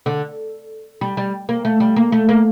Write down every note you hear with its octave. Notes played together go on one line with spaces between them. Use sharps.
D3
G3
G3
A#3
A3
G3
A#3
A3
A#3